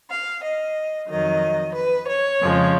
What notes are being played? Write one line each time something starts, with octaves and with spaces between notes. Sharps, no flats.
F5
D#5
F2 D#3 F#3 D#5
B4
C#5
F2 C#3 F3 G#3